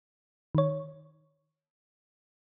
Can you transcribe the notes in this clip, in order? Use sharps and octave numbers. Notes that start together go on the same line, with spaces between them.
D#3 C#5